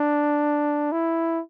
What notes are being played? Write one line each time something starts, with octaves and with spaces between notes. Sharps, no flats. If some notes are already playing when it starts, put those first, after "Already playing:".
Already playing: D4
E4